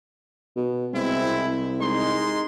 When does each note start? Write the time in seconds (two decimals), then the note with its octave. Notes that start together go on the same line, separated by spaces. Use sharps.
0.56 B2
0.93 C2 G#3 C4 E4
1.80 G#3 D#4 C6